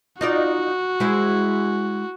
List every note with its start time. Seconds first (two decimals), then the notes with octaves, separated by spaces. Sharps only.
0.21 D#4 F4 F#4 D5
1.00 G#3 E4 C5